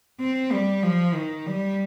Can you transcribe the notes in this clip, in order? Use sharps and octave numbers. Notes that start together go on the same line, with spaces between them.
C4
G3
F3
D#3
G3